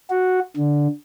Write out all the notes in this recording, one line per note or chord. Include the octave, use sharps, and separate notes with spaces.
F#4
D3